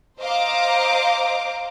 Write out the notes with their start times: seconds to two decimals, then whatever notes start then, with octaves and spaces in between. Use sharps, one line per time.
0.19 C5 D#5 F5 A#5 D6